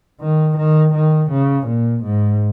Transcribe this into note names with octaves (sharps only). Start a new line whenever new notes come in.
D#3
D#3
D#3
C#3
A#2
G#2